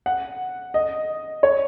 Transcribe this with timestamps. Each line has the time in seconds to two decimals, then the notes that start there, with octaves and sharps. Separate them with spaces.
0.06 F#5
0.74 D#5
1.43 C#5